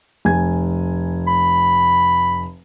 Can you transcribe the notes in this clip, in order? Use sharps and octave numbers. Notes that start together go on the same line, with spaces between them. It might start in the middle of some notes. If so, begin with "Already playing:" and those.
F1 G#5 G#6
B5